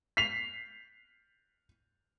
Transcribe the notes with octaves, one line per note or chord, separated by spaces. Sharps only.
B6 C7 F7